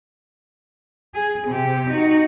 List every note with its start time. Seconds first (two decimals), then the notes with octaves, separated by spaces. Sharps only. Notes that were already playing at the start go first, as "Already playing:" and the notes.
1.15 G#4
1.48 C3 G4
1.90 D#4 F#4